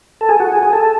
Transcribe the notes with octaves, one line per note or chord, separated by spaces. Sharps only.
A4
G#4
F#4
G#4
G#4
A4